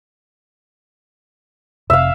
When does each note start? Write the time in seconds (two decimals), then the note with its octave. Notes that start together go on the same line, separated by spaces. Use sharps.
1.90 F1 C3 E5 F5